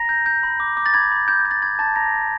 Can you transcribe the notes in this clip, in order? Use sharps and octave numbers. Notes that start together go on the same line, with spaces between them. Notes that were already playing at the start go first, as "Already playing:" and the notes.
Already playing: A#5 A#6
G6
G6
B5
D6
D6
A6
B5 G#6
B5
B5 G6
G6
A6
B5 G#6
A5 G6 A6
A#5 B5 A#6
D6